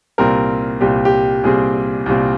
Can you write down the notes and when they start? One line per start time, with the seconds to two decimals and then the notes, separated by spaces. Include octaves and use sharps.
0.18 C2 A#2 G3 C4 A#4
0.81 C2 A#2 G3 C4 G4
1.05 G4
1.43 C2 A#2 G3 C4 G#4
2.06 C2 A#2 G3 C4